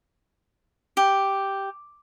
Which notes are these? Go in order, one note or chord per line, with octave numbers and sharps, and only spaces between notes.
G4